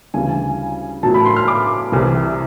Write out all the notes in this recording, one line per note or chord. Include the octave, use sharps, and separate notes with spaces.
D2 C#3 E3 G3 G#5
A2 F#3 A5
B5
C6
F6
D6
C2 C3 E3 G3